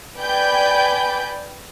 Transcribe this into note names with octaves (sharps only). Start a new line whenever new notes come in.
B4 D5 G5 G#5 B5 G6